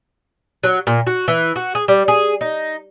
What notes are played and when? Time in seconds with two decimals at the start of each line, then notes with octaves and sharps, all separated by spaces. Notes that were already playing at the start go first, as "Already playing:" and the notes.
0.64 F#3
0.87 A#2
1.07 F#4
1.28 E3
1.56 F#4
1.75 G#4
1.88 G3
2.08 G#4
2.41 D#4